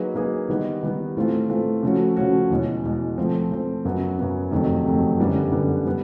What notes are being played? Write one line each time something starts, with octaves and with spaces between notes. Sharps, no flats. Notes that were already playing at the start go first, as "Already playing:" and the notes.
Already playing: F#3 A#3 D#4 G#4 B4
F#3 A#3 D#4 G#4 B4
D#3 G3 B3 D#4
D#3 G3 B3 D#4
A2 E3 A3 C4 F4
A2 E3 A3 C4 F4
C#3 F3 A3 C#4 F#4
C#3 F3 A3 C#4 F#4
E2 B2 G#3
E2 B2 G#3
F3 A3 C4
F3 A3 C4
F#2 C#3 F#3 B3
F#2 C#3 F#3 B3
F2 C3 D#3 F#3 A3
F2 C3 D#3 F#3 A3
F#2 D3 G3 B3
F#2 D3 G3 B3
G3 B3